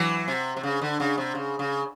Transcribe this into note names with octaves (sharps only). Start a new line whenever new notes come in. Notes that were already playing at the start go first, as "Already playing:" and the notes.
Already playing: E3 F#3
C3
C3
C#3
D3
C#3
C3
C#3
C#3